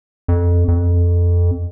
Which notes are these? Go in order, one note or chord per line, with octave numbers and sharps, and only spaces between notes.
F2
F2